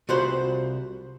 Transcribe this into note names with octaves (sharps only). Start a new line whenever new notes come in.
C2 F4 F#4 C5 B5